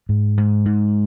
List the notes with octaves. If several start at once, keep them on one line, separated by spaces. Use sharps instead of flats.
G#2
G#2
G#2